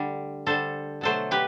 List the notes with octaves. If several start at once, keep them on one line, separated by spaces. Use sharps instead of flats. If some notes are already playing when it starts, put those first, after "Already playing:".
Already playing: D3 G3 A3
D3 G3 A4 C5
B2 F#3 A3 A4 C5
G4 B4